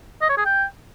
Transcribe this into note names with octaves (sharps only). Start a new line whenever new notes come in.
D#5
C#5
G#4
G5